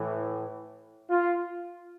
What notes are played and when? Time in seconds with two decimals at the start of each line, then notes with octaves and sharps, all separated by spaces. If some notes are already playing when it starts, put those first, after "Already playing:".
Already playing: A2 E3
1.09 F4